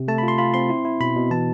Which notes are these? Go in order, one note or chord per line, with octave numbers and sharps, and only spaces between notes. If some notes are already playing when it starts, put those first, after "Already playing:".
Already playing: C3
A3 A5
B5
F4
C6
F4 B5
C4 C6
E4
E4
B2 B5
B2
E3 A5